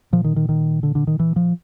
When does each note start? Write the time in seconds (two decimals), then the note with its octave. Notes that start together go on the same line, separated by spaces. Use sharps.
0.12 A#2 F3
0.24 D#3
0.36 D#3
0.49 D#3
0.83 D3
0.95 D3
1.07 D#3
1.19 E3
1.36 F3